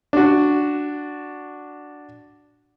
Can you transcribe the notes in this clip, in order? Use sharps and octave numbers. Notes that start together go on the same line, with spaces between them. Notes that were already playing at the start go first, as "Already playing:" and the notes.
D4 F#4